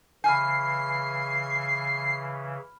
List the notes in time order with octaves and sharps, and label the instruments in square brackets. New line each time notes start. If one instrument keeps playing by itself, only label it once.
[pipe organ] C#3 E3 [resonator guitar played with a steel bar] G#5 [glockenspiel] B5 F6 G6 [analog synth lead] C7